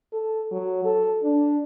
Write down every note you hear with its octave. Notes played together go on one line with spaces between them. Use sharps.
A4
F#3
A4
D4